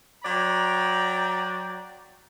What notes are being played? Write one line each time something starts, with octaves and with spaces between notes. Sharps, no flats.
F#3 D5 G5 A#5